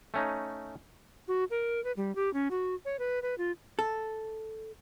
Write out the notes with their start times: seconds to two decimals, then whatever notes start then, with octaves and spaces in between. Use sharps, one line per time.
0.14 A3 C#4 D#4
1.28 F#4
1.50 A#4
1.84 B4
1.97 G3
2.16 G4
2.34 C#4
2.51 F#4
2.85 C#5
2.99 B4
3.22 B4
3.38 F4
3.79 A4